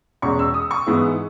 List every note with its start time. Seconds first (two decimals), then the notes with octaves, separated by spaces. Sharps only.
0.22 E2 B2 G#3 C#4 C#6
0.39 E6
0.54 D#6
0.71 C#6
0.87 G#2 E3 G#3 B3